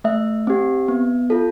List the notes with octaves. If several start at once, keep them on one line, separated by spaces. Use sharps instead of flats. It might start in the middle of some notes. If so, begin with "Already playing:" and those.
A3 E5
C4 G4
B3
F4 A4